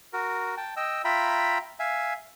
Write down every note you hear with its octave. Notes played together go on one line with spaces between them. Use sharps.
F#4 A#4
G5 A5
D#5 G5 E6
F4 E5 G5 A#5 B5
E5 F5 G#5